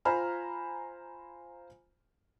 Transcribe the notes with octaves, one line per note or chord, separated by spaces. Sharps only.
F4 C5 G#5 A#5 B5 F6